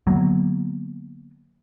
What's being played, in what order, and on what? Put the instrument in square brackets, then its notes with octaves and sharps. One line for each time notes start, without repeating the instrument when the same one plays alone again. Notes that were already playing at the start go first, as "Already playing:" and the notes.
[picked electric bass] D3 F#3 A#3 B3